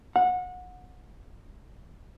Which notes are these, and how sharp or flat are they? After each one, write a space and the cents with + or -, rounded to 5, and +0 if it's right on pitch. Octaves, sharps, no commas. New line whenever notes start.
F#5 -25